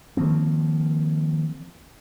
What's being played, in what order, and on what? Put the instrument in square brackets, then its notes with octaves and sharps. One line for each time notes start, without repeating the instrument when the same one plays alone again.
[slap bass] D#3 F3 A#3 C4